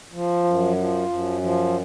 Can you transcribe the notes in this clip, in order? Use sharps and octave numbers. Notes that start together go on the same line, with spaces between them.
F3
F#2
F3
F#2
F3